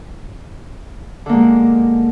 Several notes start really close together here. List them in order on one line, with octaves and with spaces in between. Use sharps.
D3 A#3 G#3